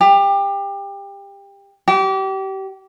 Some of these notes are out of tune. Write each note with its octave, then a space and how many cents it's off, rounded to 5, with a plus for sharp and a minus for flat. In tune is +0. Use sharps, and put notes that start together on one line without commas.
G4 +25
G4 -30